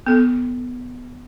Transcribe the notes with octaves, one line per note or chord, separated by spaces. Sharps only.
B3 A4